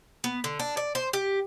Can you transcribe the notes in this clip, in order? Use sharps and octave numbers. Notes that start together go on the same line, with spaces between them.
B3
D3
D4
D5
C5
G4